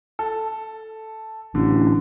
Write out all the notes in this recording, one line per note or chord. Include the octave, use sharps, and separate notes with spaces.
A4
A1 D3